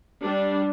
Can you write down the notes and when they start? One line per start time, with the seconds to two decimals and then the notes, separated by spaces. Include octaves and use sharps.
0.24 G3 D4